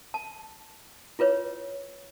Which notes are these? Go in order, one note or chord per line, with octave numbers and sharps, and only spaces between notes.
A5
E4 F4 B4 C#5